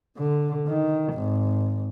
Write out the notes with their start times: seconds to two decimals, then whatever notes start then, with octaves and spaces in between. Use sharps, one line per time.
0.17 D3
0.67 D#3
1.13 G#1